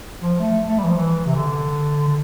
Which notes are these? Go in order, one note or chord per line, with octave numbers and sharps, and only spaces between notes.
F3
A3
A3
G3
E3
F3
E3
C3
D3
D3